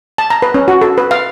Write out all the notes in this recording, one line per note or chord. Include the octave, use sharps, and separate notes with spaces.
A5
A#5
B4
C#4
F#4
A4
B4
F5